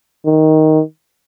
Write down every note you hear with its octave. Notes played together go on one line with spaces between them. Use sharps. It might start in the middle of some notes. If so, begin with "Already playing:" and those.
D#3